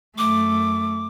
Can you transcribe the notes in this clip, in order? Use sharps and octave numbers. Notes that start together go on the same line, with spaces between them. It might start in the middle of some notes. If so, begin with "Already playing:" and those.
F#2 A3 D6